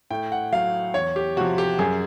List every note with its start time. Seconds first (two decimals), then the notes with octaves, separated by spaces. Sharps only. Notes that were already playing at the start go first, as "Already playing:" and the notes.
0.10 A2 G5
0.32 F#5
0.52 F#3 F5
0.94 E2 C#5
1.16 G4
1.37 C3 F3 F#4
1.58 G4
1.79 F#2 G#4